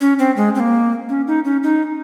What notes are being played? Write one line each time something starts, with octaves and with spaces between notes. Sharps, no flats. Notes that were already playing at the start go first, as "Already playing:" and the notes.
C#4
C4
G#3
C4
A#3
C#4
D#4
C#4
D#4